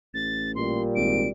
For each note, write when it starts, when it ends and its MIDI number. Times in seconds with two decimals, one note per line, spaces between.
0.14 0.85 33
0.14 0.52 93
0.56 1.29 46
0.56 1.29 55
0.56 0.82 84
0.96 1.26 32
0.96 1.28 98